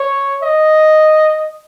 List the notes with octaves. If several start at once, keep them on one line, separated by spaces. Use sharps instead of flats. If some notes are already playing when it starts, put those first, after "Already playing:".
Already playing: C#5
D#5